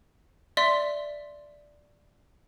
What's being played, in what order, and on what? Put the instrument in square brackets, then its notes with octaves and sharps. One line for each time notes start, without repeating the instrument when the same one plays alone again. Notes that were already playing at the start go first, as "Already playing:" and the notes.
[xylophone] D5 E5 C6